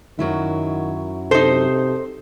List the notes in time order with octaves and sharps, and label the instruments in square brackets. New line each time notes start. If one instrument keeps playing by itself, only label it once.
[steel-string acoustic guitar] F#2 F#3 E4 [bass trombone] D#3
[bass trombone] C3 [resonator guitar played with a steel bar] D#4 C5 [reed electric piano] A4